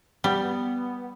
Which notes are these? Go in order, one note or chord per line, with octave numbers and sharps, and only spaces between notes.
G3 B3